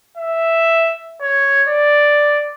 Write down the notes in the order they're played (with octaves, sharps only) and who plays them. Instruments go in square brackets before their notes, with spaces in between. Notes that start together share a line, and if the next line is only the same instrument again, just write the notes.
[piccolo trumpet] E5
C#5
D5